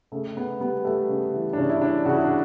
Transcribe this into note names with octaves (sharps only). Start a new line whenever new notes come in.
C#3 A3
C#3 B3
G3 B3
G3 A3
C#3
E3
D4
C#3 C#4
E4
E3 D4
C#3 F#4
E4
D4